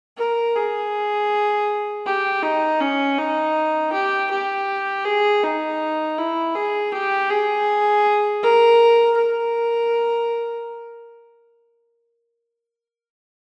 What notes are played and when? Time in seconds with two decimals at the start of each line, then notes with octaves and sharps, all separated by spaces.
0.18 A#4
0.56 G#4
2.06 G4
2.42 D#4
2.81 C#4
3.18 D#4
3.92 G4
4.31 G4
5.05 G#4
5.43 D#4
6.18 E4
6.55 G#4
6.92 G4
7.30 G#4
8.43 A#4
9.17 A#4